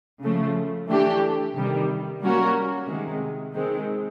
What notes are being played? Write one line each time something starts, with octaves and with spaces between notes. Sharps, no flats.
C#3 F3 A3
E3 A3 D4 G4
C3 D#3 G3
G3 A#3 C#4 F#4 A#4
C3 D#3 G#3
D#3 G#3 C4